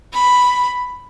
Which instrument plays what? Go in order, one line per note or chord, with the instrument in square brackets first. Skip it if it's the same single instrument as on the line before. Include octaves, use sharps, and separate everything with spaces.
[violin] B5